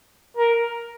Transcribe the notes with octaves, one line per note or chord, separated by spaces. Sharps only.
A#4